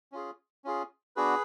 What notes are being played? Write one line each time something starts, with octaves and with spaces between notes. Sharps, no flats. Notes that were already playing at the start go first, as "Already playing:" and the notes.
C#4 F4 G#4
C#4 F4 G#4
B3 D4 F#4 G#4 B4